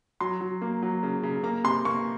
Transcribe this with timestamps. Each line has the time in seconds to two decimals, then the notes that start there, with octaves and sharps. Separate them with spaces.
0.21 F#3 C6
0.41 F#3
0.62 A#3
0.83 F#3
1.03 C#3
1.23 C#3
1.43 A#3 A#5
1.64 C3 C6
1.85 A#3 C#6